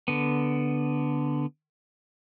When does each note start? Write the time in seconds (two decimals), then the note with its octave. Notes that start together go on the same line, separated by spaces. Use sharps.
0.08 D3 B3